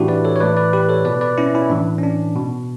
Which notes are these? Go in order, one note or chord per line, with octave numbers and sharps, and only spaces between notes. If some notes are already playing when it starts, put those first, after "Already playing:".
Already playing: A2 E3 D4 E4 F#4 G4
B4 D5
A4 C#5
C#5
A2 E3 B4 D5
B4 D5
G4 B4
A4 C#5
B2 B4 D5
B4 D5
C#4 E4
C#4 E4
A2 E3 D4
C#4
D4
B2